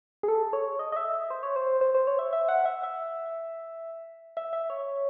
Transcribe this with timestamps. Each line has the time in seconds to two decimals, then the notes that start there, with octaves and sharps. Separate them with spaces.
0.23 G#4
0.28 A4
0.53 C#5
0.79 D#5
0.92 D#5
0.96 E5
1.30 C5
1.43 C#5
1.56 C5
1.81 C5
1.94 C5
2.07 C#5
2.19 E5
2.33 E5
2.49 F#5
2.66 E5
2.83 E5
4.37 E5
4.53 E5
4.70 C#5